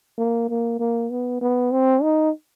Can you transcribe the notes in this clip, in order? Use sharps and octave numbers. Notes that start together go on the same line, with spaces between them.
A#3
A#3
A#3
B3
B3
C4
D#4